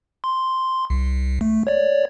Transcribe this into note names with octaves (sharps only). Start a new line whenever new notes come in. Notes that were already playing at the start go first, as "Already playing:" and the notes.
C6
C2
A3
C#5 D5